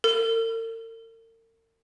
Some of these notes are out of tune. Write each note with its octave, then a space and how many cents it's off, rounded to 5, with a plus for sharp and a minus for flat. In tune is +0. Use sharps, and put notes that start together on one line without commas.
A#4 -45